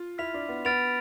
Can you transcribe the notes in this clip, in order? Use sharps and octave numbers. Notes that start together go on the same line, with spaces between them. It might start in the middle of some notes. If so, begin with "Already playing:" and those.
Already playing: F4
E4 F6 B6 F7
D4
B3
B3 F6 A6 D7 F7